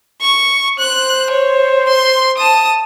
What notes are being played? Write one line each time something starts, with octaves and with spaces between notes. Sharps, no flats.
C#6
C5 F#6
C#5
C6
A5 D#6